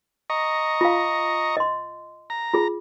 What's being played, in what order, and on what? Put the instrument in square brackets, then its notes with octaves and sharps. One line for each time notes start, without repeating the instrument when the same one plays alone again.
[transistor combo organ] D#5 A#5 C#6
[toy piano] F4 F5
D#5 C6
[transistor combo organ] A#5
[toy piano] F4 G#4